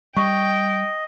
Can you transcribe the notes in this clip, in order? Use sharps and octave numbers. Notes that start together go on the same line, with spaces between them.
G3 D#5 G5 C#6